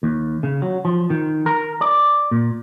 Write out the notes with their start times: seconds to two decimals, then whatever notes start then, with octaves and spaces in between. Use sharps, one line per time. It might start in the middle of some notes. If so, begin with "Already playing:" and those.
0.03 D#2
0.43 C#3
0.62 F#3
0.85 F3
1.10 D#3
1.46 A#4
1.81 D5
2.31 A#2